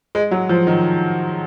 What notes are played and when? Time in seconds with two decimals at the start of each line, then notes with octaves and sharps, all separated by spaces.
0.15 G#3
0.31 F#3
0.49 F3
0.67 D#3